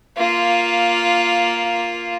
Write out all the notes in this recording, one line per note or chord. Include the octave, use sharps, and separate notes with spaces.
A#3 F4